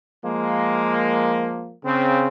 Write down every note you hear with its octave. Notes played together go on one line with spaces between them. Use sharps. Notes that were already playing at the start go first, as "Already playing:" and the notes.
F3 G#3 A#3
C#3 C4